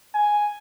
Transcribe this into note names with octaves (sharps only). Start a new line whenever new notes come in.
G#5